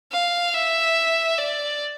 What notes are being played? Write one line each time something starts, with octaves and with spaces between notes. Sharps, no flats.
F5
E5
D5